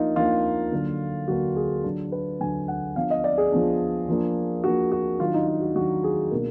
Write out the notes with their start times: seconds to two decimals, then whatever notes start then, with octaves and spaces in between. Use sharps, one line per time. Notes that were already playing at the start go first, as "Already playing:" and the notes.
Already playing: F3 A#3 D4 D#4 F4
0.16 F3 A#3 D4 F4
0.72 D3 F#3 A#3 D4
1.28 D3 F#3 A#3 D4 F#4
1.56 G#4
1.84 D3 F#3 D4
2.12 B4
2.40 D3 F#3 D4 G#5
2.68 F#5
2.96 F3 B3 D4 F5
3.10 D#5
3.24 D5
3.38 G#4
3.52 F3 B3 D4
4.09 F3 A#3 D4
4.63 F3 A#3 D4 F#4
4.92 F#4
5.19 D#3 F#3 D4 F4
5.34 D#4
5.47 F4
5.61 F#4
5.75 D#3 F#3 D4 F#4
6.04 G#4
6.31 B2 A#3 D4 A#4